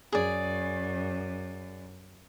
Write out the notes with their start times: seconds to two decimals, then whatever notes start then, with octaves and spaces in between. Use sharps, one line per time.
0.12 F#2 G#4 D5